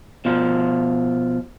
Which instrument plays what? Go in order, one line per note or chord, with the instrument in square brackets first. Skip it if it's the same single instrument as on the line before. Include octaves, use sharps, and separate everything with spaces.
[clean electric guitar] B2 F3 F4